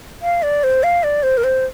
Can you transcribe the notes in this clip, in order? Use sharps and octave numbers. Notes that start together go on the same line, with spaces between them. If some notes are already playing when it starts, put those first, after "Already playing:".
F5
D5
C5
F5
D5
C5
A#4
C5